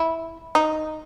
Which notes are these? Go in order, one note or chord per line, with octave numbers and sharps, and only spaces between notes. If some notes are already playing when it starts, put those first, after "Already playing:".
Already playing: E4
D#4